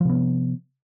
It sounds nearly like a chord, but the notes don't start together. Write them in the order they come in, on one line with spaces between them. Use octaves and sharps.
F3 C3 B3